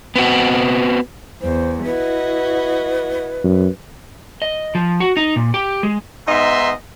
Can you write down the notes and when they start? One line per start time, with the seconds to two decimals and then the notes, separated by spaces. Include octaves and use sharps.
0.16 B3 C4 F#4
1.41 E2 C5
1.85 E4 F#4 B4 D#5
3.44 F#2
4.42 D#5
4.75 F3
5.00 F#4
5.17 D#4
5.36 A#2
5.54 G4
5.83 G#3
6.27 G#2 B3 D#4 D#5 E5 C6